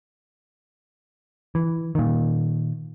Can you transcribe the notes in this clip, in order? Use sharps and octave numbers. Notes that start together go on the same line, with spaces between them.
E3
A#2 D#3